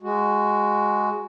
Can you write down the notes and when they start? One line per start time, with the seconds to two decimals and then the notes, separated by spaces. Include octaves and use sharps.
0.03 G#3 F#4